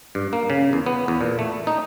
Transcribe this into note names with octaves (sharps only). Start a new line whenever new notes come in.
G2
A#3
C#3
E2
B3
E2
A#2
A3
D#4